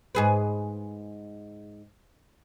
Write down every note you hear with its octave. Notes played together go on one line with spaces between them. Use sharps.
G#2 G#4 B4